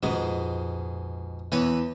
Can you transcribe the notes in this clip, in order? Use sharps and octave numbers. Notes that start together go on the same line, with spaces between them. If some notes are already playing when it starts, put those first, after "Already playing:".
A#1 F2 G#2 B2 G#3
E2 E3 B4 C#5